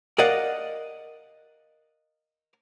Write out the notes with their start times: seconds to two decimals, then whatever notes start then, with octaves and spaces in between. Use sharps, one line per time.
0.18 A#4 D5 D#5 F5 F#5